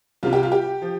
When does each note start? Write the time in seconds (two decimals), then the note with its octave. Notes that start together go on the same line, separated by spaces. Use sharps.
0.23 C2 C3 G3 F4
0.33 G4
0.43 F4
0.52 G4
0.82 F3